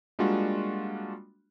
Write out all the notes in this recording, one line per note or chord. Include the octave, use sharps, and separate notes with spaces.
G3 G#3 A#3 D4 F4 F#4